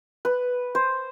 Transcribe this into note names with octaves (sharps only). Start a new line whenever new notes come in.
B4
C5